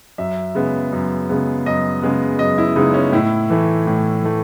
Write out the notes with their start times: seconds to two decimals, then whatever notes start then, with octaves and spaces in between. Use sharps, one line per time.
0.18 F#2 E5
0.55 C#3 G#3 B3
0.92 F#2
1.29 C#3 G#3 B3
1.66 F#2 D#5
2.02 C#3 G#3 B3
2.39 F#2 D#5
2.58 E4
2.76 C#3 G#3 B3 D#4
2.94 C#4
3.12 A2 E4
3.50 E3 A3
3.87 A2
4.23 E3 A3